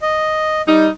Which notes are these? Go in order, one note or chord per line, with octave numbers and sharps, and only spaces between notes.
D#5
G3 D#4